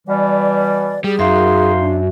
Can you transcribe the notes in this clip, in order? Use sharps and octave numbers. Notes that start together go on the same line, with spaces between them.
B2 E3 G3 D5
G3 G#4
F#2 A#3 D#4 F#4 E5 C6
D4